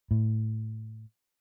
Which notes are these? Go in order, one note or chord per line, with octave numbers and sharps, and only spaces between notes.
A2